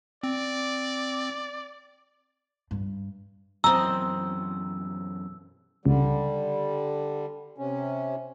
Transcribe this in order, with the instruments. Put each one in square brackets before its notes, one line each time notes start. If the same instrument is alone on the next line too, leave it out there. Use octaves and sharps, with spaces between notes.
[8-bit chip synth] C4 [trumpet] D5
[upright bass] G2
[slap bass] F#2 B2 E3 [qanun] C4 D#5 [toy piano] A#5 [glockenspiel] E6
[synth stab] C#2 [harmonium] D3 G3
[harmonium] C3 C#4